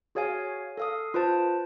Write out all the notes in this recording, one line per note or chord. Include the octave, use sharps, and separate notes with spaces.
F#4 G#4 C#5 F5 G#5
A4 F5 D#6
F4 B4 C5 A5